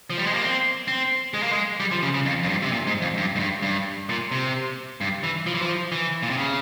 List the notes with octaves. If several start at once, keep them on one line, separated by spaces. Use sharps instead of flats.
F3
G3
G#3
A#3
C4
C4
G#3
A#3
G#3
G3
F3
C#3
C#3
F2
F2
G2
C3
A#2
G#2
F2
G2
G#2
G2
G2
A#2
C3
G2
E3
F3
E3
F3
E3
A#2
C3
C#3